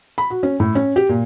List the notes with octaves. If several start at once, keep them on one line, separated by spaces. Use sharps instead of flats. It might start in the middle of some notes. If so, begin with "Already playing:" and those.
B5
F#4
C#4
A2
C#4
G4
A#2